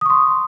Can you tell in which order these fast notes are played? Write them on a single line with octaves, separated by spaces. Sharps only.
D#6 C#6 C6